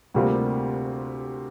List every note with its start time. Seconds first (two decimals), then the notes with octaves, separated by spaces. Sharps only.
0.14 D2 C3 G3 A#3 F4